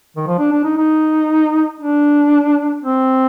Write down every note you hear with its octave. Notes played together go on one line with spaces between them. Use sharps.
D#3
F3
D4
D4
D#4
D#4
D4
C4